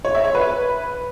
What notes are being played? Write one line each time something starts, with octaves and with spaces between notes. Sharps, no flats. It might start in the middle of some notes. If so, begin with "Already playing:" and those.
C#5
E5
C#5
B4